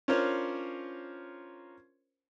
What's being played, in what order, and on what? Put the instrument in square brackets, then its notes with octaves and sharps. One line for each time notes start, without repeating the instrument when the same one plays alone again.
[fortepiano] C#4 D4 F4 A#4 C5 C#5